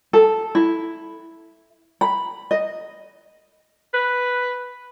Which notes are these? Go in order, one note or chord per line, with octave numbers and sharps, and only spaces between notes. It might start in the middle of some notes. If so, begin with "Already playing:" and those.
A4
E4
B5
D#5
B4